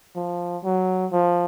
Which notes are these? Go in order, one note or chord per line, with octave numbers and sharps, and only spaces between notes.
F3
F#3
F3